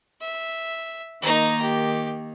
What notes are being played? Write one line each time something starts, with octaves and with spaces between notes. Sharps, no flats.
E5
D#3 A#3 D#4 A#5
G4